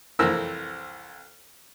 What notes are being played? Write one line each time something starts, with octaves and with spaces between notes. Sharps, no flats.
C2 F2 E3 C4 A#4 E6